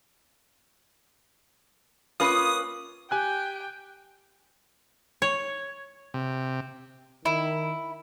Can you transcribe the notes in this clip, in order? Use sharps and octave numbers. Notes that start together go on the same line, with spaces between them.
A#3 C#4 F4 B4 D#6
G4 G5 G#5 F#6
C#5
C3
D#3 E4